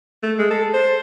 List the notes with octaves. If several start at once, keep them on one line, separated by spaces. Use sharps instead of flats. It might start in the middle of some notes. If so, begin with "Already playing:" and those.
A3
G#3
A4
C5